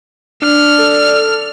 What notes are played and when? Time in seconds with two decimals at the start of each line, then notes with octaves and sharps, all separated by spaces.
0.42 D4 F6
0.79 A4